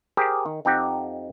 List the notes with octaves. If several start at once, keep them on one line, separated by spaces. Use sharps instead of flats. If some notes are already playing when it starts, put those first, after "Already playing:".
G4 G#4 A#4 C5
D#3
F2 C4 D#4 G4 F#5